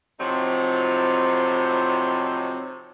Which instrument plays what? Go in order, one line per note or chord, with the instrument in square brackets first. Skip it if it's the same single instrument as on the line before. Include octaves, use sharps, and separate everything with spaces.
[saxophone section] A2 C3 F3 F#3 C4 D#4